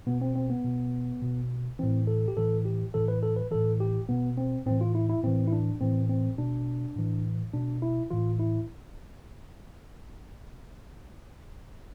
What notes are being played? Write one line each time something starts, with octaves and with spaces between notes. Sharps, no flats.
B2 B3
C4
C4
B3
B2
B2
A2 E3 C4
A4
G4
A2 E3 A4
G4
A2 E3 A4
B4
A4
B4
A2 E3 A4
G4
B2 B3
C4
A2 E3 C4
F4
E4
E4
A2 E3 C4
E4
D4
A2 E3 C4
C4
B2 D4
A2 E3
B2 D4
E4
A2 E3 F4
E4